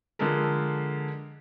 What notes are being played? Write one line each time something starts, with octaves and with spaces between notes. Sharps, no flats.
D3 F3 G#3 A4 A#4